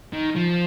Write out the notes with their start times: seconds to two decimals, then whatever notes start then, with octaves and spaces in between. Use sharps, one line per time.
0.13 D#3
0.36 F3